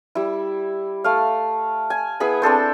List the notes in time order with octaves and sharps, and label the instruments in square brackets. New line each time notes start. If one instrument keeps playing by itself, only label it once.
[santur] G3 E4
A3 F5
G#5
B3 E4 G#4 B5
C4 D4 A4 C5